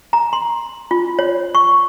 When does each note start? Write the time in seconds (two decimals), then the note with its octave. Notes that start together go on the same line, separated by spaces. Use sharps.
0.13 A#5
0.33 C6
0.91 F4
1.19 C#5
1.55 C#6